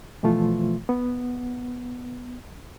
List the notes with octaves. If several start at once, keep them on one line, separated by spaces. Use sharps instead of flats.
B2 E3 F3 A3 F4
B3